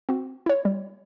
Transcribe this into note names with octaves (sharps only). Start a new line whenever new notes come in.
C4 F#4
E4 C#5
G3